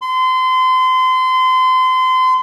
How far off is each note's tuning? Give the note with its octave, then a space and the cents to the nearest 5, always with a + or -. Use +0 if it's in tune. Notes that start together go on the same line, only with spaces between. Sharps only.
C6 -30